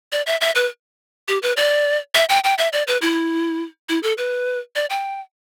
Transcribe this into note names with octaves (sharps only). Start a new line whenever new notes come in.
D5
E5
E5
B4
G4
B4
D5
E5
G5
G5
E5
D5
B4
E4
E4
A4
B4
D5
G5